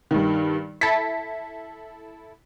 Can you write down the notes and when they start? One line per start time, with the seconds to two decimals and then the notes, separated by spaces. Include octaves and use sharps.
0.11 G2 D#3
0.81 E4 A4 B6